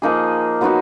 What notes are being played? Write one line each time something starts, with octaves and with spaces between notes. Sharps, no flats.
F3 A#3 D#4 G#4
F#3 B3 D#4 F#4